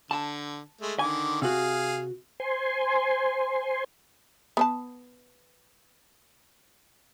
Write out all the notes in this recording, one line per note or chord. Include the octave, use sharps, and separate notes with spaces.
D3 A5
G#3 A3
D3 D#3 G#5 D6
C3 F#4 G#4 F5
C5 G#5 C6
B3 C5 A5